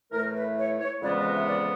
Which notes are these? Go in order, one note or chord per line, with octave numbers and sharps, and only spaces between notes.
A2 E3 A3 A#4
B4
C#5
C#5
F2 C#3 E3 G#3 B3 D5
D#5
E5
D5